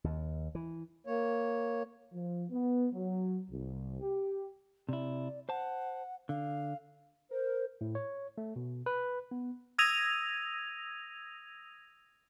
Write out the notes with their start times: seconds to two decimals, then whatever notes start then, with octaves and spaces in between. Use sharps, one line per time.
0.04 D#2
0.55 E3
1.07 A#3 C#5
2.13 F3
2.51 B3
2.93 F#3
3.50 C2
4.01 G4
4.89 C3 E4 D5
5.49 C5 F#5 A5
6.29 D3 F5
7.31 A#4 C5
7.81 A2
7.95 C#5
8.38 A3
8.56 B2
8.86 B4
9.31 B3
9.78 D#6 E6 G#6 A#6 D#7 F7